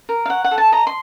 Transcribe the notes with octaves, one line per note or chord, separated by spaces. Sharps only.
A#4
F5
C#5 F#5
F#5
A4
A5
D#5 A#5
C6